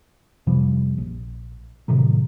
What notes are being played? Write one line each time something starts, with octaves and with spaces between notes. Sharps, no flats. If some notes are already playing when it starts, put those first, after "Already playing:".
F2 C3 F3 G3
A#1
A2 C3 D#3 F#3